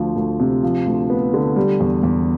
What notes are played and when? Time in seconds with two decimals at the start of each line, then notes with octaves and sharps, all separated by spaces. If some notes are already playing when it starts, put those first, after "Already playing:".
Already playing: D2 D3 F3
0.16 D2
0.40 C3
0.63 F3
0.87 D2
1.10 B3
1.34 D3
1.56 G3
1.80 E2
2.03 E2